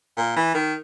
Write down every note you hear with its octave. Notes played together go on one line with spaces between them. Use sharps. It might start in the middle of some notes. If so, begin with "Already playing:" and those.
A#2
E3
D#3